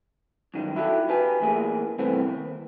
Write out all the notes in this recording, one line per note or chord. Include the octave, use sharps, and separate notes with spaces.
F#2 D#3 G3
E4 F#4 G4 A4
G4 B4 G#5
E2 A2 A#3 G#4
C2 E3 A3 B3 C4
D#2